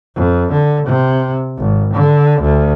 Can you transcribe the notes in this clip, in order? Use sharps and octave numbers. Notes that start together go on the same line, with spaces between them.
F2
D3
C3
G#1
D3
D2